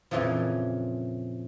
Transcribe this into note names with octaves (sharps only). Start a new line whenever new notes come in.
F2 A#2 C#3 E3 F3